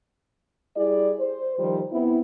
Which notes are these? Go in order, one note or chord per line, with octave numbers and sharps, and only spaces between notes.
G3 E4 G#4 D5
C5
D#3 F3 G3 C5
B3 C4 E4